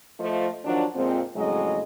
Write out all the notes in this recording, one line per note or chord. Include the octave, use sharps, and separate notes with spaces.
F3 A3 F4 C5 D#5
D#3 F3 F#3 D4
F2 A#2 F3 G#3 C4
F2 A2 C#3 F#3 G#3 D#5